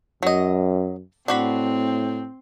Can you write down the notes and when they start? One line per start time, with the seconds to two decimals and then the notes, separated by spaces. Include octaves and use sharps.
0.23 F#2 F#3 D#5
1.28 A2 C4 D4 F#4 B5